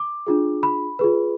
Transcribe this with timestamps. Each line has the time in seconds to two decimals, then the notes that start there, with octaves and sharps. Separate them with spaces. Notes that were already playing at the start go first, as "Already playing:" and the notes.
Already playing: D6
0.27 D4 F4 G#4
0.63 B5
0.99 F4 G#4 B4